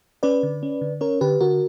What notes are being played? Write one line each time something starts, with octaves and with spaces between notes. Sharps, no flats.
C#4 B4 D5
D3
C#4
D3
C#4 A#4 C#5
D3 G4 B4
D3 F#4 A#4